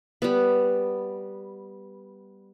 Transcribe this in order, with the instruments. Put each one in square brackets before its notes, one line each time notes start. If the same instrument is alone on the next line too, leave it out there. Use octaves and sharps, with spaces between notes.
[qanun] G3 B3